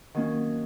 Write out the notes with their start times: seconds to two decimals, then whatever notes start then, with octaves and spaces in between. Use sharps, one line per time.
0.15 D#3 F#3 A#3 C#4